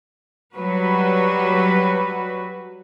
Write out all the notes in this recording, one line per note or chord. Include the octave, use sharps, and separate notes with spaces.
F#3 G3 F#4 B4